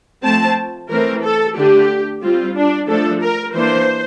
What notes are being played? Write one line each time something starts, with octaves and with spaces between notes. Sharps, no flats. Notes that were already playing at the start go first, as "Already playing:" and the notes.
F3 A3 C4 A5
E3 A3 C4 A#4
A4
D3 A3 D4 G4
G3 C4 F4
D4
F3 A3 D4 A4
A#4
E3 A#3 D4 C5